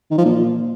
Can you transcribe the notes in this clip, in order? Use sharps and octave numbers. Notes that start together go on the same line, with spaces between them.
D#3
F3
A#2